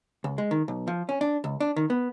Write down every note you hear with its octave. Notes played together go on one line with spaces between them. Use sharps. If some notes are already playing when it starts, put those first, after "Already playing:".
C#2
G#3
D#3
B1
F3
C#4
D4
C#2
D4
D#3
B3